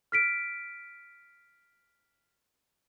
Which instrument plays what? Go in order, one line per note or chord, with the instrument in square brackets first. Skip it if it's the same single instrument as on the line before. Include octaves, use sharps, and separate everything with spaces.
[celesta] F6 B6 D7